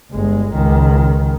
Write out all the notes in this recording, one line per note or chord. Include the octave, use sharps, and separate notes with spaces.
G1 G#3
C#2 D#3